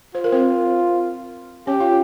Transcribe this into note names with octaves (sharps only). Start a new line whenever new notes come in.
F4 C5
A#4
C4 C5
C#4 G4 C#5
F4 F5